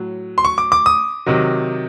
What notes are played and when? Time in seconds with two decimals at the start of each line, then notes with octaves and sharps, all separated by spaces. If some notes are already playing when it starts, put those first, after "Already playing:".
Already playing: A2 F#3
0.38 C6
0.45 C#6
0.58 D6
0.72 D6
0.86 D#6
1.26 C3 D#3 F#3